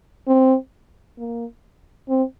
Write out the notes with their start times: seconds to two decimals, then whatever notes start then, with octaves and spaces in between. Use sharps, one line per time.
0.28 C4
1.18 A#3
2.09 C4